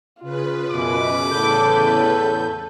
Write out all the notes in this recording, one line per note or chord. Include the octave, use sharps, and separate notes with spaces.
C#3 F4 B4
F#2 B2 D6
E2 A2 A4 G6